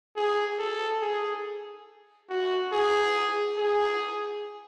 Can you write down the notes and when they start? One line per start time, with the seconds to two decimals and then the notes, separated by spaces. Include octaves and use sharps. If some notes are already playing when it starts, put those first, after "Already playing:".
0.16 G#4
0.59 A4
1.02 G#4
2.30 F#4
2.72 G#4
3.58 G#4